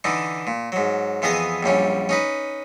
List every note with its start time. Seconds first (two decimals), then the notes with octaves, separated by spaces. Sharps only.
0.04 D3 E3 D4 D#4
0.47 A#2
0.72 G#2 F#3
1.22 F2 E3 B3 G#4 D#5 D#6
1.63 A#1 F#2 G3 C#4
2.09 C#4 D#4 B4